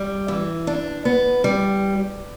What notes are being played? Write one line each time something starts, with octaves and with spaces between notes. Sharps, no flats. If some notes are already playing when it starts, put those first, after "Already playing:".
Already playing: G3
E3
D4
B3
G3